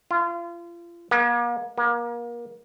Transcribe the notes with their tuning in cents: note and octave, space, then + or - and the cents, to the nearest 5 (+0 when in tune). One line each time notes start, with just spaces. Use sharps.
F4 -30
A#3 +40
A#3 +30